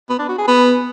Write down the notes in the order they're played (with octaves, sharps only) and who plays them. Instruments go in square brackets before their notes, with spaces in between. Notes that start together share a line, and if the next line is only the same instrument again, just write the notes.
[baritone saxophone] B3
D4
F#4
G#4
B3